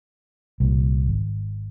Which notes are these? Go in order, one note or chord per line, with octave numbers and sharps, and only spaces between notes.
C2 A#2
G#1